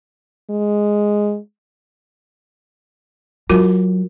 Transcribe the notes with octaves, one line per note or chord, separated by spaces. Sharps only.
G#3
F#3 F4 F#4 A#4